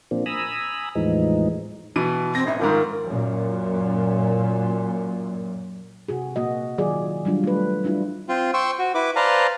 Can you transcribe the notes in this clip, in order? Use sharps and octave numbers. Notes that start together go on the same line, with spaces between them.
A#2 F3 A#3 C4 D4
G#5 A#5 B5 D#6 E6
E2 A2 E3 F3 G#3 D#4
B2 E3 D#7
C4 A#6
A1 E5
G#2 D#3 F3 A#4
F#2 A#2
C3 F#4 G#4
A#2 A#3 F#4 D#5
D#3 F#3 F4 G#4 D5
F#3 G3 D4 F4
A3 B4
G3 D4 E4 F4
C4 F4
C5 G5 C6 C#6 E6
F#4
E4 B4 D6
B4 C5 D5 F5 A5 A#5